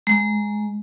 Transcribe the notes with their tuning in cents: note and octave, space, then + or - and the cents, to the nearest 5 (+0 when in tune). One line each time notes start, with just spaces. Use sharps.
G#3 +10